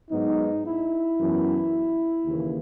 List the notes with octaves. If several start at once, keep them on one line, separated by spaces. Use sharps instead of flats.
G#2 F#3 B3 D#4
E4
F#2 E3 B3
D#2 C#3 E3 A#3